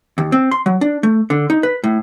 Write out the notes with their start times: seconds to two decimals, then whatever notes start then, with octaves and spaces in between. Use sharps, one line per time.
0.18 D#2
0.32 C4
0.51 C6
0.66 F#3
0.81 D4
1.03 A3
1.30 D3
1.50 D#4
1.63 B4
1.84 A2